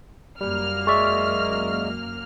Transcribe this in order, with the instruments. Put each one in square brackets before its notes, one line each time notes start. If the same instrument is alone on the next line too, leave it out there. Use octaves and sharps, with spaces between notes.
[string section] F#2 A#3 F6 [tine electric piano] G3
[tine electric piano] G#3 D5 E5 [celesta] C#6